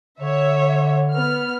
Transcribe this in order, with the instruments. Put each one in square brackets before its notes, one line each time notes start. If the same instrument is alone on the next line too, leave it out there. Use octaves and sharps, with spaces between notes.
[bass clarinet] D3 [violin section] C#5 E5
[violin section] B3 F6